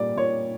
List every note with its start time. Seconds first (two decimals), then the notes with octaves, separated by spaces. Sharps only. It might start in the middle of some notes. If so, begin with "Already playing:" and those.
Already playing: A#2 G3 D5
0.17 A#2 C#5